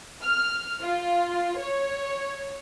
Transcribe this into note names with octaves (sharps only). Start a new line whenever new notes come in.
F6
F4
C#5